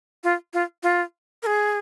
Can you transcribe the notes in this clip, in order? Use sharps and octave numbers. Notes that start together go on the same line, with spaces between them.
F4
F4
F4
A#4
G#4